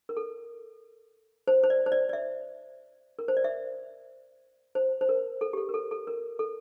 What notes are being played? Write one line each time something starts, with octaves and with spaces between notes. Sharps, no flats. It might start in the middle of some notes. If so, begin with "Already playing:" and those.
A#4
A4
C5
C5
D5
C5
D5
D5
E5
A#4
C5
D5
E5
C5
C5
A#4
A4
G4
A4
A#4
A4
A4
A#4
A4